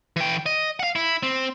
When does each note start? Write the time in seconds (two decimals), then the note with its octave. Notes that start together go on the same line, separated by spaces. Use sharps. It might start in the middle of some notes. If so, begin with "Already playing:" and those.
0.16 E3 G5
0.46 D#5
0.80 F5 F#5
0.95 E4
1.23 C4